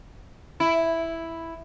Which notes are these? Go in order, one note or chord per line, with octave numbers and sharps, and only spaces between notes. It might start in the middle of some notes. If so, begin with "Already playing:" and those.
E4